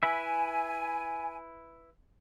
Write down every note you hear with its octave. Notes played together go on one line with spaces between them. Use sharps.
E4 B4 E5 G#5